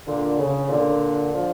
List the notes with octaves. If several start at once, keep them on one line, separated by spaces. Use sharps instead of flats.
A#2 D3
C#3
A#2 D3
D3 F3